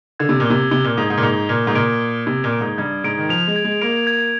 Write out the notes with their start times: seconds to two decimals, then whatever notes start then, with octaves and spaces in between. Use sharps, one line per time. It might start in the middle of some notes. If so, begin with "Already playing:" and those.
0.19 D3 G#6
0.29 C3
0.40 A#2
0.45 C3 G7
0.71 C3 G7
0.84 A#2
0.97 G#2 D#6
1.10 G#2
1.17 A#2
1.23 G#2 G7
1.49 A#2 G#6
1.67 G#2
1.75 A#2 D7
2.01 D7
2.26 C3 G#6
2.44 A#2
2.52 D7
2.61 G#2
2.78 G2 G#6
3.04 G#2 D7
3.18 D#3
3.29 F3 F7
3.47 G#3
3.56 G#6
3.64 G#3
3.81 A#3 D7
4.07 G#6